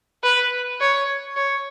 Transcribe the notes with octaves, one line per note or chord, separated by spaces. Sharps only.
B4
C#5
C#5